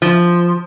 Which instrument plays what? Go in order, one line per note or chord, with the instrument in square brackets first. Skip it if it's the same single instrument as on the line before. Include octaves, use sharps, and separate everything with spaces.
[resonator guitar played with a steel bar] F3